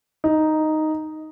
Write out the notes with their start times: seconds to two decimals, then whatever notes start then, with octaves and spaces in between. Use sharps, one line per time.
0.24 D#4